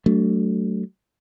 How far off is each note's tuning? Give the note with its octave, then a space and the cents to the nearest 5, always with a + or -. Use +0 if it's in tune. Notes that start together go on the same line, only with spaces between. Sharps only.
F#3 +40 A3 +10 D4 -10